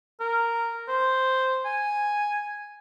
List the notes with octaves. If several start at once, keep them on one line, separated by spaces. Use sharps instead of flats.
A#4
C5
G#5